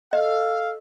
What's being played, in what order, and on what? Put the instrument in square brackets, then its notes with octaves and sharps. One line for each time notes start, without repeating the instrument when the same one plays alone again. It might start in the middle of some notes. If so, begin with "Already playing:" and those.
[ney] A4 [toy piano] D#5 [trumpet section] F5